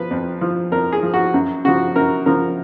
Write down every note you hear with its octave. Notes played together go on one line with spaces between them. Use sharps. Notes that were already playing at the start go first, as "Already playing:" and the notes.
Already playing: F3 B4
F2
F3
F2 A#4
G#4
F3
F#4
F#2
C#3 F3 F#4
F#2 A#4
C#3 F3 A#4